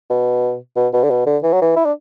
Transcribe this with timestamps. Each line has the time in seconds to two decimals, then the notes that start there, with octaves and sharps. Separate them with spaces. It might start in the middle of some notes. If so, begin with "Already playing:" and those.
0.10 B2
0.76 B2
0.93 B2
1.03 D3
1.10 B2
1.26 D3
1.43 E3
1.53 F#3
1.62 E3
1.76 E4
1.85 D4